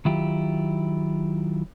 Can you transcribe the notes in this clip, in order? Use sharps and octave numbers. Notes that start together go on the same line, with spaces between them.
D#3 F#3 E4 F4 G4